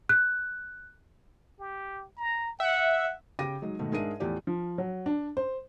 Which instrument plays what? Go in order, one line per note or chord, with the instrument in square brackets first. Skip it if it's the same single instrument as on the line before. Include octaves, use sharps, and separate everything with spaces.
[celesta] F#6
[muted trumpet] G4
A#5
[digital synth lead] E5 [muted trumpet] F#5
[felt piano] C#3 G4 G5 D6 A#6 D#7
F#3 G#3 D#4
G#2 B2 D#3 A3
G#2 D4 G#4 A#4 E5 D#7
E2 A2 F3 G4 D5
[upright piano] F3
F#3
D4
C5